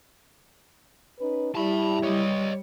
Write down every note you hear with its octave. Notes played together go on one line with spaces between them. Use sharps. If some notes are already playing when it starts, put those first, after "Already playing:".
C#4 D#4 B4
G3 E4 G4 A5 B5
G3 C#5 D#5